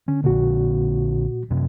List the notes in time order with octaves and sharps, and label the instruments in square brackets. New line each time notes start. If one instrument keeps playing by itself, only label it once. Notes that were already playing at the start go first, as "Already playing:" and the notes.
[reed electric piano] D3 [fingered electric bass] C#4
[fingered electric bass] A#1 D3 [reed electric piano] A#2 F#4
[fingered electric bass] F#2 C3